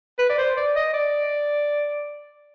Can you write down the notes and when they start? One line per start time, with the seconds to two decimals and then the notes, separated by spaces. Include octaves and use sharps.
0.19 B4
0.30 D5
0.38 C5
0.57 D5
0.76 D#5
0.94 D5